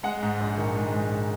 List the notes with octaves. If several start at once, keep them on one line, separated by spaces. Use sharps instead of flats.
G#3 F#5
G#2
A#1
D#3
G#3
G#2